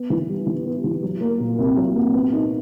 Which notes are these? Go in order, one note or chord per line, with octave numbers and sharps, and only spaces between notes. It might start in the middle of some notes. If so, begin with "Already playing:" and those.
Already playing: B3
E3
G3
E3
B3
E3
F#3
A#3
A#2
C2
F#3
A#3
B3
D#4